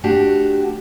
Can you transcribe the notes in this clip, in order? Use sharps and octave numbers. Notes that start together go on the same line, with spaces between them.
A3 D4 F#4 G4